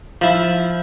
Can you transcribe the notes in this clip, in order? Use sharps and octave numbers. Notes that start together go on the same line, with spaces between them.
F3 E4